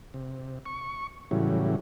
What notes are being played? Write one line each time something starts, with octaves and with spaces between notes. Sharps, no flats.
C3
C#6
A2 C#3 E3 F#3 G3